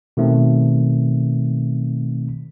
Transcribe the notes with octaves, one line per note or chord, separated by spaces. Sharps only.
B2 D#3 A3 C4